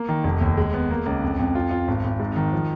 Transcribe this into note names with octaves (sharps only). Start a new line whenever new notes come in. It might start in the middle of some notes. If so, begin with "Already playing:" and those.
Already playing: A#3
D#3
F1
D#2
G#3
B3
A#3
C#2
F2
F2
F4
F4
G#1
G#1
G#2
D#3
F3